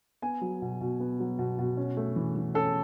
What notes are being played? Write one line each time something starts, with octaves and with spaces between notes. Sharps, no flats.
B3 G#5
F#3
B2
B2
B3
F#3
B2
B2
C#4
A3
E3
E3
C#4 A4